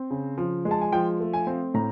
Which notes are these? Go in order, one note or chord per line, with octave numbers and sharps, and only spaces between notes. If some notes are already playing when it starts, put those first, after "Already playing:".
Already playing: C4
C#3
F3
G#3
A5
G#5
F3 G5
A3
G#5
C4
A2 A#5